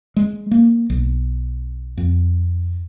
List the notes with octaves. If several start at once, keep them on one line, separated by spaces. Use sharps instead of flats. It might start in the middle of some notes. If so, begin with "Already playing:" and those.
G#3
A#3
B1
F2